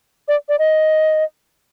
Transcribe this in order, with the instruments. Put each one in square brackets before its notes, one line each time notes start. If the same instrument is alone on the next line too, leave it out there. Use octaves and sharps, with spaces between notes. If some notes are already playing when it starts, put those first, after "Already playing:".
[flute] D5
D5
D#5